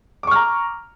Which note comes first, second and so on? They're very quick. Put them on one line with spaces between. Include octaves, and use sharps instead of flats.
D6 C#6 F6 A#5